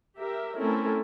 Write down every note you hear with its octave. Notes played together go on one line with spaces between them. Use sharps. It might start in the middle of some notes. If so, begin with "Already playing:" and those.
G4 A#4 E5
A3 C4 C#4 E4 A4 A#4